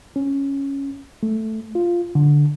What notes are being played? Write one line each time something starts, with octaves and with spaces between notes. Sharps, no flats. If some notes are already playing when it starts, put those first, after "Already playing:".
C#4
A3
F4
D3